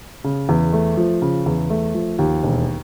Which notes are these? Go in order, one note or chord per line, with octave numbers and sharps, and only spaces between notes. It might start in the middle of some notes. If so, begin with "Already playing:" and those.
C#3
E2
A3
F3
C#3
E2
A3
F3
D#2
E1